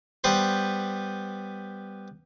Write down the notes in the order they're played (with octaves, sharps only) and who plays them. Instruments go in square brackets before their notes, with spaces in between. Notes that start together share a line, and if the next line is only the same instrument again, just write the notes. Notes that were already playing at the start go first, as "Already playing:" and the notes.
[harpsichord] G3 B3 B4 C5